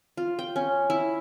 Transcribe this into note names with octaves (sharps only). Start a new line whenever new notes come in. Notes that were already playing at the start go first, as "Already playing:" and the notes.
F4
G5
C#4
E4